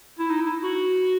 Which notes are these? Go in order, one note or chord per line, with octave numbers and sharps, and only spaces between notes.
E4
D#4
E4
F#4